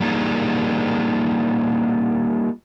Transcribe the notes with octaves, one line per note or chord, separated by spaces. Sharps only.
G3 A#3 D4 D#4 F4 G#4